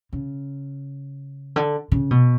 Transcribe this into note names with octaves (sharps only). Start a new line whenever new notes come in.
C#3
D3
C#3
B2